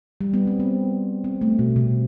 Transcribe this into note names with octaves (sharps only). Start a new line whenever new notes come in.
G3
B3
C4
C4
C4
A3
B2
C3